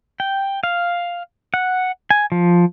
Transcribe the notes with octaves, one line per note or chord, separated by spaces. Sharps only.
G5
F5
F#5
G#5
F3